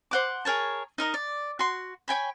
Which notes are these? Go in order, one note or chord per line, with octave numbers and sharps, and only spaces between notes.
C5 F#5 D6
G#4 A#4 C#5 A5
D#4 A#4 D#5
D5
F#4 C6
C#5 G5 G#5 B5